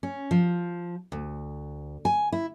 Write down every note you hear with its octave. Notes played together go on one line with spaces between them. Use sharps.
C#4
F3
D2
G#5
E4